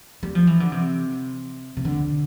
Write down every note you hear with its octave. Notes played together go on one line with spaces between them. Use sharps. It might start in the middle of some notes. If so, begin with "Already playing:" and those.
G3
F3
E3
D3
C3
C3
D3